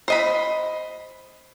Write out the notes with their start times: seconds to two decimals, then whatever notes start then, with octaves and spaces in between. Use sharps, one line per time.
0.08 C5 D#5 B5